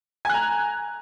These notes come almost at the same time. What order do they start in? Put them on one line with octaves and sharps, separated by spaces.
G#5 F#6 A#5